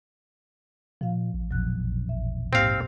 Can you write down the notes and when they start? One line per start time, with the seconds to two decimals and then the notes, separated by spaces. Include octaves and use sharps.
1.01 A#2 F3 F5
1.34 A1
1.51 E1 A#1 F#3 F#6
2.09 E5
2.53 G#2 A#3 C4 G4 F5 A#6